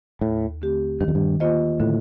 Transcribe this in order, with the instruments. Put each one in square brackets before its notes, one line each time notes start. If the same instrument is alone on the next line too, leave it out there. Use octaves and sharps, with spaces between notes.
[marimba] D#2 [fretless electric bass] A2
[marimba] D3 A3 C4 G4
[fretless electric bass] G2 [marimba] D#3
[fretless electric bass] F2
G2
[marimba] A#3 F4 C5 D#5
[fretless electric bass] A2 [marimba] D3